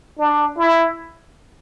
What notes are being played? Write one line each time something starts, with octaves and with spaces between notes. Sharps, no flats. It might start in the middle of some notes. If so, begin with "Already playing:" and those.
D4
E4